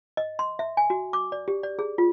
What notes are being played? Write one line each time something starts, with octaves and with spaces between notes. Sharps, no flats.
D#5
C6
E5
G#5
F#4
D6
D5
G4
D5
G#4
F4